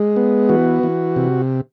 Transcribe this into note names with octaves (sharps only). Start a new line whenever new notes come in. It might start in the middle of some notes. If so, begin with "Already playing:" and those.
Already playing: G#3
B3
E3 F#4
E3
C3